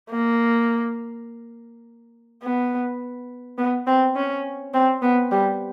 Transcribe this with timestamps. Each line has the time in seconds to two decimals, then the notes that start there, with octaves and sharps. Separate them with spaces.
0.10 A#3
2.43 B3
3.58 B3
3.87 C4
4.16 C#4
4.74 C4
5.02 B3
5.31 G3